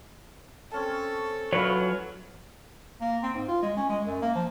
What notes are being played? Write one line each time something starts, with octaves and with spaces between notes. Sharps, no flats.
C4 C#4 A4 A5
F#3 C#4 E4 F4 B4 C#5
A#3
C4
G#2
F4
G#3
C#4
G#3
F#2
A#3
F3